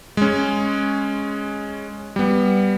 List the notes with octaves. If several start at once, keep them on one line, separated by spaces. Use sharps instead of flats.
G#3 C#4
G3 B3